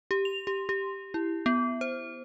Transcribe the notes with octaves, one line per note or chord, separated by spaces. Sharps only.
G4
F7
G4
G4
E4
B3
C5